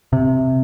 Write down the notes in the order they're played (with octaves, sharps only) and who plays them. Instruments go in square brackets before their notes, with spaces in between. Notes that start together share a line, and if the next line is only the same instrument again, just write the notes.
[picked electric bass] C3